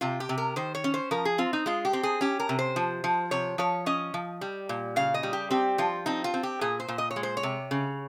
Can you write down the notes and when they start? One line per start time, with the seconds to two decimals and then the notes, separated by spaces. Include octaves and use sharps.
0.01 C3 F4
0.20 G4
0.29 C3
0.38 A#4
0.56 D#3 C5
0.75 C#5
0.84 C#4
0.94 C5
1.11 F3 A#4
1.25 G#4
1.38 C4 F4
1.53 D#4
1.66 G#3 F4
1.85 G4
1.93 C4
2.03 G#4
2.21 C#4 G4
2.40 A#4
2.49 C3
2.59 C5
2.76 F3
3.04 F3
3.31 C3 C#5
3.58 F3 C#5
3.86 C#4 D#5
4.14 F3
4.41 G3
4.69 A#2
4.96 C#3 F5
5.14 D#5
5.23 G3
5.33 G4
5.51 C4 G4
5.78 F3 F4
6.06 C4 D#4
6.24 F4
6.34 C4
6.43 G4
6.61 A#2 G#4
6.80 C5
6.88 A#2
6.98 D#5
7.11 C#5
7.16 G#3
7.23 C5
7.37 C#5
7.43 C3
7.71 C#3